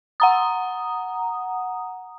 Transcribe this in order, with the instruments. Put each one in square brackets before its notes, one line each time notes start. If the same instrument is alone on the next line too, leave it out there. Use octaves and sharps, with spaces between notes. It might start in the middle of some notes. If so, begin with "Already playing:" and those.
[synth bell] F#5 A#5 D#6